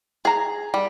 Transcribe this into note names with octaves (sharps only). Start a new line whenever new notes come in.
G#4 A#5
G3